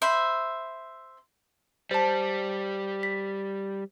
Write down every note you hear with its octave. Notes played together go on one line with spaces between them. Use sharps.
C5 E5 B5
G3 C5 A5
B6